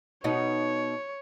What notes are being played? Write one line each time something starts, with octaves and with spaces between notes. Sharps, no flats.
B2 D#4 C#5